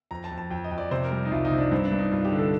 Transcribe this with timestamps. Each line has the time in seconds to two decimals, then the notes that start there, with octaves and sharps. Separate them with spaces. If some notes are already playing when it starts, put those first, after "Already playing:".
0.11 F2 A#5
0.24 A5
0.31 F2
0.38 A5
0.51 F2 G5
0.64 D#5
0.72 F2
0.78 D5
0.91 C3 C5
1.05 A#4
1.11 G3
1.25 D#4
1.31 C2 F4
1.45 D#4
1.51 C3
1.58 D4
1.71 G2 C4
1.85 D4
1.92 G2
1.99 D#4
2.12 G2 F4
2.25 G4
2.32 D3
2.39 A4